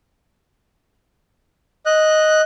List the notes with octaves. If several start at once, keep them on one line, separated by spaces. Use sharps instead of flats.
D#5 F#6